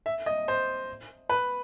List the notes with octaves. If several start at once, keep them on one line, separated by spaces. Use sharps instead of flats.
E5
D#5
C5
B4